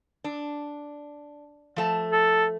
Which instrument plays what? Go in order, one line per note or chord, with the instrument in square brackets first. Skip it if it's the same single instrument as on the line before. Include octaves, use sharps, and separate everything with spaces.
[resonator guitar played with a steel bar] D4
F3 A3 A5
[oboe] A4